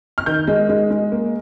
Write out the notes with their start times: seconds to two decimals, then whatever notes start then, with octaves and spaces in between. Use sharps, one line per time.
0.18 F6
0.26 D#3 G6
0.48 G#3
0.69 G#3
0.90 G#3
1.12 A#3